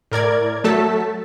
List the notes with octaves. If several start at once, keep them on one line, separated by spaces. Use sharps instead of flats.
A2 A#4 D5 G#6
F#3 A3 A4 A5 B6